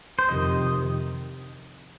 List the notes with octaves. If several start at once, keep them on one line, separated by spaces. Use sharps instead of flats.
C5
F2 C3 D#3 D#5